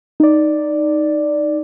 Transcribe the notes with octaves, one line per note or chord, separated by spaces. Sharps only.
D#4 D5